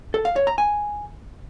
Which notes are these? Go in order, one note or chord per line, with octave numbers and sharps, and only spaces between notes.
A4
F5
C#5
A#5
G#5